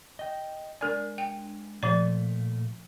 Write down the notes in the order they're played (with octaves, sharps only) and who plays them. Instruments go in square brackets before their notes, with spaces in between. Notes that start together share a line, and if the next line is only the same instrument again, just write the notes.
[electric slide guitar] D#5 G5
[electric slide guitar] G#3 D4 G#5 [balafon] A#4 D5
[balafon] G5
[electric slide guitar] A#2 A3 [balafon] F3 D5